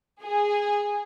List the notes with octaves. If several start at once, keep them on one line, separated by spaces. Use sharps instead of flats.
G#4